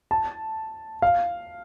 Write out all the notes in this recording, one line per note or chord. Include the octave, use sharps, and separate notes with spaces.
A5
F5